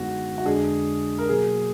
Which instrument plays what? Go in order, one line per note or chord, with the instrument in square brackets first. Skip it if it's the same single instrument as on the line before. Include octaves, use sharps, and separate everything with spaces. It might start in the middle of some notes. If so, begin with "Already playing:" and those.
Already playing: [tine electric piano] F#2 D3 G#3 B3 D#4 [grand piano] F#4
[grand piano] F#4
[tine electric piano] F2 D3 G#3 D4 [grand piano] G#4
[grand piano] A#4
[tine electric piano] B2 F#3 A#3 [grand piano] G#4